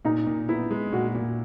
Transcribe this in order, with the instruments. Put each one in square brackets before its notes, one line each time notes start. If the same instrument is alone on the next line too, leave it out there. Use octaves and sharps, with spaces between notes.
[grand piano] A#2 [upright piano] D#4
[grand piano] A#2
[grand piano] B3 [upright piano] E4
[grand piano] G#3
[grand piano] A#2 [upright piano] F#4
[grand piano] A#2